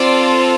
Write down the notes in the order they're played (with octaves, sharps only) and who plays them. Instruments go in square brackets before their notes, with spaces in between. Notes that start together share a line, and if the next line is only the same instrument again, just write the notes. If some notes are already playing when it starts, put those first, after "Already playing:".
Already playing: [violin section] C4 F4 A4 D5